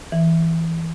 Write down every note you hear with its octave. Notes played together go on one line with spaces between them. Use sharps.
E3